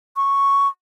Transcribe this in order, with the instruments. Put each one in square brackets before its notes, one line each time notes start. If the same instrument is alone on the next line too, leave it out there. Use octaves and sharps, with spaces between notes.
[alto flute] C#6